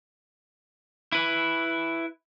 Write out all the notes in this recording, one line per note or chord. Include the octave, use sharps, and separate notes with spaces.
E4 B4